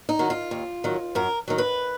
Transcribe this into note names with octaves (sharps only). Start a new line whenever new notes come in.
D#4
D#3 F#3
F4
D#2
D#3 F#3
F#2 A#4
D#3 F#3
B4